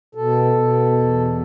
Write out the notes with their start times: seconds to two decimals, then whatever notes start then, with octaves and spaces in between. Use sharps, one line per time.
0.15 B2 A4
0.53 B2
0.92 E2